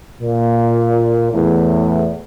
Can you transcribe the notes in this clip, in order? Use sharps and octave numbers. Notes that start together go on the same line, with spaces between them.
A#2
E2 A2